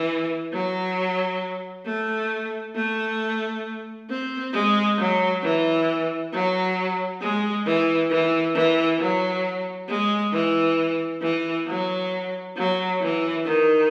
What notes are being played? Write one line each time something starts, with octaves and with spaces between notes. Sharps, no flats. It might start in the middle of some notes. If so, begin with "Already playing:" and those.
Already playing: E3
F#3
A3
A3
C4
G#3
F#3
E3
F#3
G#3
E3
E3
E3
F#3
G#3
E3
E3
F#3
F#3
E3
D#3